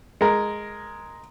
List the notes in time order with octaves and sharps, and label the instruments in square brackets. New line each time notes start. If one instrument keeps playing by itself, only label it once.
[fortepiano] G#3 A#4